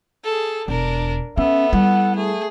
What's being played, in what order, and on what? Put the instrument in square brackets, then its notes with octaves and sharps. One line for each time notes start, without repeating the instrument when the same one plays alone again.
[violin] G#4 A4
[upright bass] E1 [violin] D4 A#4
[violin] B3 A4 [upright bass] C#4 [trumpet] E5
[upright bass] G3 E4 [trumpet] F#5
[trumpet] A3 [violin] G#4